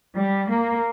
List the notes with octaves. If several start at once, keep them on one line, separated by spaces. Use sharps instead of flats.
G3
A#3